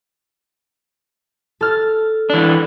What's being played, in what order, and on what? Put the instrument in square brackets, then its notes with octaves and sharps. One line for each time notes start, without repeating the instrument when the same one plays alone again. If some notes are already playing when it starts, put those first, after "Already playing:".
[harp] A4 F6 A6
[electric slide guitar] E3 D4